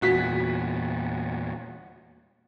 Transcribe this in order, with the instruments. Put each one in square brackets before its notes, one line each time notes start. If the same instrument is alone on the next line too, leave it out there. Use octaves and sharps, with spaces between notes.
[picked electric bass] E2 A#2 [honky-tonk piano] F#4 B6